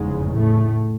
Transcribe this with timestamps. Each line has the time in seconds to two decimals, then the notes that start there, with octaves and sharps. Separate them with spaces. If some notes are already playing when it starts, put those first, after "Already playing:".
Already playing: F1 E2 G#2 C#3 G#3
0.34 A2 A3